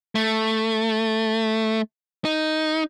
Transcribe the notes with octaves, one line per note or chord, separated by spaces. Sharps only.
A3
D#4